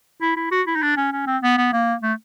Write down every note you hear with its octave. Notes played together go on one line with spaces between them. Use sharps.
E4
E4
F#4
E4
D#4
D4
C#4
C#4
C4
B3
B3
A#3
A3